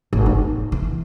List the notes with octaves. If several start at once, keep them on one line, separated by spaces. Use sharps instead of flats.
G#1
D#4
E3